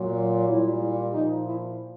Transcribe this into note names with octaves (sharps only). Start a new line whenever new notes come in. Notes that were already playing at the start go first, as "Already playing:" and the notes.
Already playing: A#2 F#3
A#2 G3 E4
A#2 F3 D#4
E4